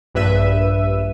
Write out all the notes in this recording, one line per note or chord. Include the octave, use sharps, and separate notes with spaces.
A#1 G2 B4 E5 D#7